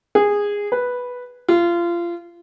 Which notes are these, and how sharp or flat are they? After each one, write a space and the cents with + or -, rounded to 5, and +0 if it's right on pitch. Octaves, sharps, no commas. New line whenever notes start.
G#4 -15
B4 -5
F4 -25